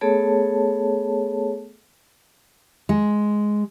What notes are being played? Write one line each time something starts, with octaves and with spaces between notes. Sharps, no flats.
A3 B3 G#4 A4 C#5 A5
G#3